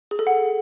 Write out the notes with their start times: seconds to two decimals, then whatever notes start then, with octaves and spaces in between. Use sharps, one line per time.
0.11 G#4
0.19 A4
0.27 F#5